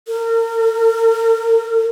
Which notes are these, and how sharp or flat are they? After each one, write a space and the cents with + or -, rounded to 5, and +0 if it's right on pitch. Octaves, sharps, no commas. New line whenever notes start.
A#4 -35